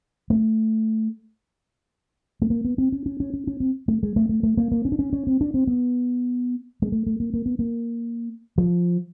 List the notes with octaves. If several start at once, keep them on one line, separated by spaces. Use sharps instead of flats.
A3
A3
A#3
B3
C4
C#4
C#4
C#4
C#4
C#4
C4
A3
G#3
A3
A3
A3
A#3
A#3
C#4
D4
C#4
C#4
C4
D4
C4
B3
G#3
A3
A3
A#3
A#3
B3
A#3
F3